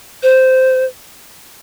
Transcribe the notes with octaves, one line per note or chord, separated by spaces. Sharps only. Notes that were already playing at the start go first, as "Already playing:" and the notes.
C5